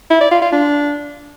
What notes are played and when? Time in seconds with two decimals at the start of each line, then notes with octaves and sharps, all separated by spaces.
0.10 E4
0.21 D5
0.31 F4
0.42 F4
0.52 D4